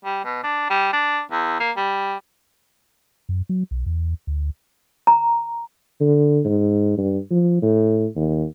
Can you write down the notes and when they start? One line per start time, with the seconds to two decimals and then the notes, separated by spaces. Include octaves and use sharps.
0.05 G3
0.25 B2
0.43 D4
0.70 G3
0.93 D4
1.31 E2
1.60 A#3
1.77 G3
3.29 F#2
3.49 F#3
3.71 B1
3.86 E2
4.27 D2
5.07 A#5
6.00 D3
6.45 G#2
6.97 G2
7.31 F3
7.62 A2
8.16 D#2